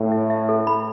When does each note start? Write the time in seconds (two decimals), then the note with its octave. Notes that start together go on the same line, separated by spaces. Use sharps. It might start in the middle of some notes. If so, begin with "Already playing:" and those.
Already playing: A2
0.12 E5
0.30 E5
0.49 A4
0.67 B5